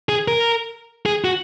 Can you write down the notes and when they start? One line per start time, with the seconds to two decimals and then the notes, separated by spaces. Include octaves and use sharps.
0.09 G#4
0.28 A#4
1.06 G#4
1.24 F#4